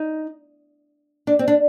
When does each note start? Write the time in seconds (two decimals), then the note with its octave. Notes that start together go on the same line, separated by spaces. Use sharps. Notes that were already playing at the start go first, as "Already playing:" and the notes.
Already playing: D#4
1.27 D4
1.39 C4
1.48 D4